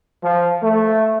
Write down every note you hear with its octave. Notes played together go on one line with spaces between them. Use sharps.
F3
A3